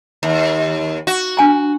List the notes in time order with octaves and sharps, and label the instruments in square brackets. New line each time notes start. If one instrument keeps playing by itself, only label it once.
[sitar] D#2
F#4
[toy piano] D4 G#5 A#5